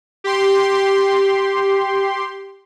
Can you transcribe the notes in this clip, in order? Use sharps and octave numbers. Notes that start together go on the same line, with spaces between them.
G4 C6